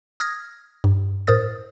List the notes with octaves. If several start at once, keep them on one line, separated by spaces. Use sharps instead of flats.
D#6 F6 G#6 A#6
G2
A2 A#4 C5 D#6 A6